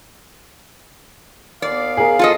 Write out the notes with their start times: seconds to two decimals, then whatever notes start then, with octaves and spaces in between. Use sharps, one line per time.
1.62 D#2 B3 D5 F5
1.97 G#4 A#4
2.19 F4 A4 D#5